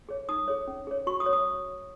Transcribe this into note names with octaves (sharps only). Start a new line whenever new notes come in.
G#4 C#5
D#4 D#6
G#4 C#5
C#4
G#4 C#5
F#4 C#6
D#6
C#5
D#6